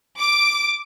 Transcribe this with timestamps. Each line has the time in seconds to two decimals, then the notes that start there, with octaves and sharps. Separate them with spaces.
0.18 D6